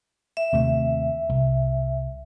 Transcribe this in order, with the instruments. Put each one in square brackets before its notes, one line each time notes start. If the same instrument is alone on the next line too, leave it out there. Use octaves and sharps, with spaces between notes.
[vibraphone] E5
[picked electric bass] D#2 C3 A3
C2